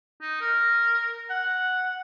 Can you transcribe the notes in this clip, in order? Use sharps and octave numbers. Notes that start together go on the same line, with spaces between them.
D#4
A#4
F#5